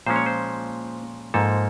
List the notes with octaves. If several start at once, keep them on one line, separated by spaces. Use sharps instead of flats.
A#2 F3 G#3 C#4 C5
C#5
C5
G#2 F3 A#3 A4